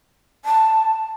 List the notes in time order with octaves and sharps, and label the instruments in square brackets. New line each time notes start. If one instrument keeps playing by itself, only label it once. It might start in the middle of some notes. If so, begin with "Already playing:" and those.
[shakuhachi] A5